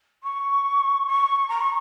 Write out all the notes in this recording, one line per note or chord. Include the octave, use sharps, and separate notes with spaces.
C#6
C#6
A#5
C#6